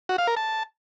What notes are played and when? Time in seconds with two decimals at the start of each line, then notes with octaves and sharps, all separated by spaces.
0.09 F#4
0.18 F5
0.27 A#4
0.37 A5